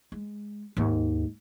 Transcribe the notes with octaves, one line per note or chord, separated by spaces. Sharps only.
G#3
D#2 G#2